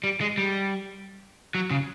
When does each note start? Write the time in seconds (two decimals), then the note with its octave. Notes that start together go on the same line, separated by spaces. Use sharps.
0.04 G3
0.21 G#3
0.38 G3
1.55 F#3
1.71 C#3